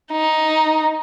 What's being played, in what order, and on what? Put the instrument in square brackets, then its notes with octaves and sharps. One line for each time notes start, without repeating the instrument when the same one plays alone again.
[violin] D#4